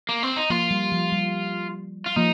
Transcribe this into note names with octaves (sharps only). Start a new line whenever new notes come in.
A#3
C4
D#4
F3 A#3 F4
G3
F3
G3
F4
F3 A#3 D#4